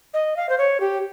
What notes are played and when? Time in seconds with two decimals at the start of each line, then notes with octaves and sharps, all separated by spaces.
0.14 D#5
0.36 F5
0.49 C5
0.58 C#5
0.80 G4